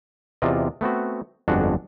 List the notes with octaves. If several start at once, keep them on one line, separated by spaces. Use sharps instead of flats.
E2 C3 F4 D5 D#5
A3 B3 C4 F#4
G1 F2 G#3 D4 F#4 F#5